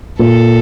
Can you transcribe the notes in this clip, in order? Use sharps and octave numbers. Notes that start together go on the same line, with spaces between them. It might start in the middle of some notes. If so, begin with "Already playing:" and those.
A#2 A4